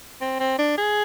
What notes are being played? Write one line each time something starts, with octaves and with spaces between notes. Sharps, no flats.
C4
C4
D4
G#4